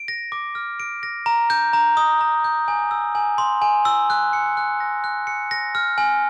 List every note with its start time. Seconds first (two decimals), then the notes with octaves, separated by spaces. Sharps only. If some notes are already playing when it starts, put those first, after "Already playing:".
Already playing: D7
0.08 A#6
0.32 D6
0.55 F6
0.80 D7
1.03 A#6
1.26 A#5
1.50 G6
1.73 A#5
1.97 D#6
2.21 A#5
2.44 G6
2.68 G#5
2.91 E6
3.15 G#5
3.38 C6
3.62 G#5
3.85 E6
4.10 F#6
4.33 C#7
4.57 F#6
4.80 A#6
5.04 F#6
5.27 C#7
5.51 A#6
5.75 F6
5.98 G#5